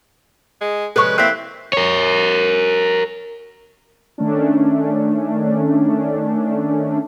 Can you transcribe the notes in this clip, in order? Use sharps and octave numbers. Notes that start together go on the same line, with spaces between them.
G#3
C3 G#3 C#4 A4 B4 C#6
A#3 C4 E4 F#6 B6
A#4 C#5
D#3 A3 C#4 D4